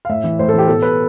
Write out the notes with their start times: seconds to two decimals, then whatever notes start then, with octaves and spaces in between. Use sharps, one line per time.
0.05 F5
0.09 A2 E5
0.24 E3
0.39 A2 C5
0.49 A4
0.54 E3 G4
0.67 B2 A4
0.82 B4